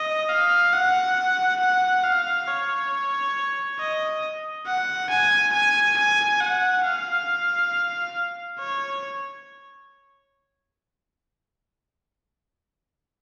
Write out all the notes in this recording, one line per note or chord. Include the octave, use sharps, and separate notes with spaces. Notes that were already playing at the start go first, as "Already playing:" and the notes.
Already playing: D#5
F5
F#5
F#5
F5
C#5
D#5
F#5
G#5
G#5
G#5
F#5
F5
C#5